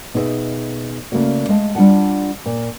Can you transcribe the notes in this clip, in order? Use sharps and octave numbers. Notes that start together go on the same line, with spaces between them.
B2 D#4 G#4 C5 E5
C#3 A3 A#3 F#4 D5
G#3 A3 D#5 F5 A5
G3 D4 F4 D5 F#5 A5
A#2